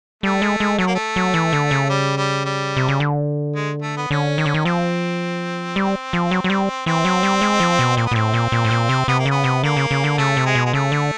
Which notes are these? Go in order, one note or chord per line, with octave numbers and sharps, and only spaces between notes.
G3 A3
G#3
G#3
F#3 A3
A#3
A3
F#3
E3
D3
C#3
G3
G3
G3
C3
C#3
D3
G#3
A3
B3
D3 C#4
D#3
D3
D#3
F3 C4
G3
F3
F#3
F#3
G3
E3 C4
F#3
G3
G#3
F3
B2
A#2 C4
B3
A#2
A2 C4
A#2
A#2
A2
A#2
C3
C3 B3
A#3
C#3 B3
C3
D3 A#3
C#3
C#3
D3
C#3 A3
C3
G#3
B2
G#3
C#3 A3
D3